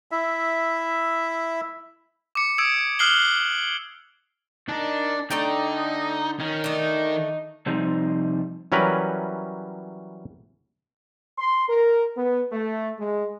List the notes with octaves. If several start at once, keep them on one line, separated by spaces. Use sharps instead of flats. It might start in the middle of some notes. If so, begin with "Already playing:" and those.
E4 E5
D6 C#7
D#6 E6 G#6 D7
D#6 F6 F#6 C7 F#7 G7
D#3 D4 A#4
D3 A3 D#4 D5 G5
D#3 C#4
A3 D4 D#4
C3 F3 G3 C4 D#4
E3 F#3 G3 C#4 A#4 B4
C6
A#4
B3
A3
G#3